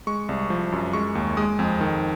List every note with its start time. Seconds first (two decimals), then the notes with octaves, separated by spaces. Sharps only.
0.07 G#3 C#6
0.29 C2
0.50 F3
0.72 F#2
0.93 G#3 C#6
1.15 D#2
1.37 G#3 D#6
1.59 F2
1.81 D#3